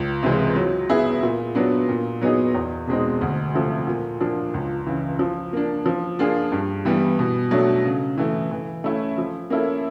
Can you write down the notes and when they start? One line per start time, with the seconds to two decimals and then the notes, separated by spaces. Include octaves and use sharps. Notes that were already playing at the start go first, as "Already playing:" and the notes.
Already playing: C#2
0.23 C3 E3 G#3
0.55 F#3
0.89 B3 E4 G#4
1.23 A#2
1.55 F#3 B3 D4
1.88 A#2
2.21 F#3 B3 D#4 G#4
2.55 E2
2.87 B2 G#3 C4 D#4
3.21 D2
3.54 C3 F3 A3
3.87 A#2
4.20 F3 A#3 D4
4.54 C#2
4.87 C#3 E3
5.19 F3
5.53 A#3 D4
5.86 F3
6.19 A#3 D4 F4 G#4
6.52 G2
6.85 E3 G3 B3
7.19 B2
7.51 F#3 A3 D4
7.85 C#3
8.18 E3 A3
8.51 E3
8.84 A3 C#4 E4
9.18 F3
9.50 A#3 C#4 E4 A4